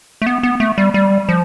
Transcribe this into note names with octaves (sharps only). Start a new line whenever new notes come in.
A3
B3
B3
A3
G3
G3
F3